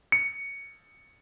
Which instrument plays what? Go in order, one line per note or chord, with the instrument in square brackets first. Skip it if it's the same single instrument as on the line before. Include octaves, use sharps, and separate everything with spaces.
[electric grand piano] C#7